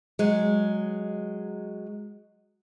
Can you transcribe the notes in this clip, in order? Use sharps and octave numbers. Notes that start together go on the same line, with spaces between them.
F#3 G#3